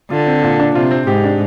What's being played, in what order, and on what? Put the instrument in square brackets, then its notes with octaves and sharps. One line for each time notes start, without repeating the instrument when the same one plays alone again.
[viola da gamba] D3 [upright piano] F4
[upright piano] C4
A#2
D4
[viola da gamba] C3 [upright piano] F4
[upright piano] C4
[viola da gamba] G#2 [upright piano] G4
[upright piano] D4